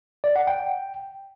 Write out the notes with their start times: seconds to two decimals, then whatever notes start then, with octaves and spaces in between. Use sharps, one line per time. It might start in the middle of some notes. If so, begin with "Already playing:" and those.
0.24 D5
0.36 F#5
0.47 G5